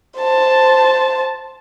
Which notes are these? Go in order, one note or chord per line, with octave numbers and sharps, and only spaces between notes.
C5 A5